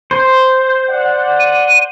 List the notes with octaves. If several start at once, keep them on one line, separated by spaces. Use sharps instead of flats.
C5
D5 F#5
D#7